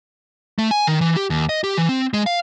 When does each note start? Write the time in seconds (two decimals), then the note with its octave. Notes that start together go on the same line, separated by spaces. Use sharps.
0.58 A3
0.71 G#5
0.87 D#3
1.01 E3
1.17 G4
1.30 D#2
1.49 D#5
1.64 G4
1.77 E3
1.89 C4
2.14 G#3
2.26 F5